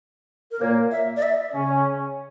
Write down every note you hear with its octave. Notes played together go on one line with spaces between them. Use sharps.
A#4
A#2 A#3 C#5
E5
D5
E5
C#3 C#4